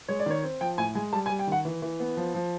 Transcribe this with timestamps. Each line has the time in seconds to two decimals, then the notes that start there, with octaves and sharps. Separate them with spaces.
0.09 G#3 C#5
0.19 D5
0.26 D#3 C#5
0.43 C4
0.61 F3 G5
0.78 A2 G#5
0.95 G#3 G#5
1.13 G3 A5
1.26 G#5
1.30 G3
1.39 G5
1.47 D#3 F#5
1.65 E3
1.82 E3
2.00 B3
2.17 F3
2.34 F3